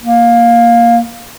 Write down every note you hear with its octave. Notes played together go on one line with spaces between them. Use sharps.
A#3